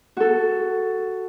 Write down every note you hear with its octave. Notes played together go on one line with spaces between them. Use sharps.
F#4 A4